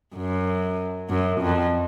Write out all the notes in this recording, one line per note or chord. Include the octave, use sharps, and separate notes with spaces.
F#2
F#2
F2